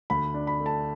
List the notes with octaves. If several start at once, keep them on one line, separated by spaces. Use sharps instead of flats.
D2 B5
D4
B5
A3
A5